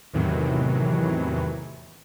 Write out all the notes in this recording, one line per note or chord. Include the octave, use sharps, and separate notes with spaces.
E2 A2 C3 D#3 E3 F#3